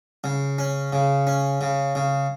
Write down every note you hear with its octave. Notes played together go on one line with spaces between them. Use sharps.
C#3
C#4
C#3
C#4
C#3
C#3